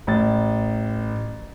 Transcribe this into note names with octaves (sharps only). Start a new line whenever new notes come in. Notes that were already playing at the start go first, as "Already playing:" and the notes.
A1 A6